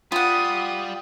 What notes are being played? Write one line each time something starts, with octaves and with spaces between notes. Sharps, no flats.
G3 F4 F#5 D#6